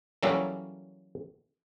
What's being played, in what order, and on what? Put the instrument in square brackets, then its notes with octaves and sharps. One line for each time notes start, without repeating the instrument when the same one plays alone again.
[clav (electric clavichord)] E3 F#3 G3 A#3 C#4 A4